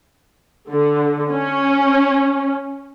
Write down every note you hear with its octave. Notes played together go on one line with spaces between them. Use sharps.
D3
C#4